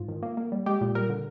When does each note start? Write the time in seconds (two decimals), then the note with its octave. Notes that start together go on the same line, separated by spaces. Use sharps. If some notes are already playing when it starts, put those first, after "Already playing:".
Already playing: G#2 F4
0.08 D#3
0.23 A#3
0.37 A#3
0.52 G3
0.66 G#3 G4
0.81 A#2
0.95 G3 A#4
1.10 D3